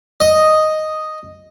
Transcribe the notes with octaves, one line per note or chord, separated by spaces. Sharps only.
D#5